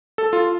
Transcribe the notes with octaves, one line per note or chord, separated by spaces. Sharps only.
A4
F4